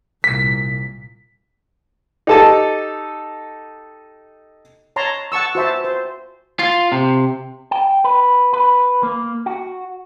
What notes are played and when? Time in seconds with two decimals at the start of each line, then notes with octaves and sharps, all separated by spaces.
0.24 C2 A#2 B6
2.27 D#4 G4 A4 D#5 A5
4.96 C#5 A5 A#5 C6
5.32 F#5 A5 C#6 E6
5.55 F#4 C5 E5 A5
5.84 C5
6.59 F4
6.92 C3
7.71 G5
8.04 B4
8.54 B4
9.03 A#3
9.46 F#4